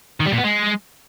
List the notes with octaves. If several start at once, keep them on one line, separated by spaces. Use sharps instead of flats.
D#3
G3
A#2
B3
G#3